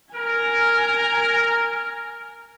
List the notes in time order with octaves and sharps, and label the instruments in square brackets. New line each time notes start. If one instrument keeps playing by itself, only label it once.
[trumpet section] A#4 [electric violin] G#5 F6